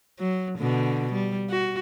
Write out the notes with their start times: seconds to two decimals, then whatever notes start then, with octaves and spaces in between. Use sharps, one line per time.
0.19 F#3
0.58 B2 D3
1.12 G3
1.50 F#4